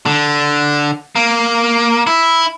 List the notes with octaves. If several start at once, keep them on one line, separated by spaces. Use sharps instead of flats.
D3
A#3
E4